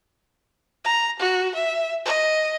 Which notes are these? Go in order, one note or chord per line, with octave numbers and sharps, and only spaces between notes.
A#5
F#4
E5
D#5